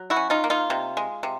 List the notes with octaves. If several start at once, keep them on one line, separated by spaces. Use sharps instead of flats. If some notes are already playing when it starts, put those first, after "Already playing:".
Already playing: F#3
E4 F#4
C#4
D#4 F4
A#3
D#4 F4
C3
G#3
C3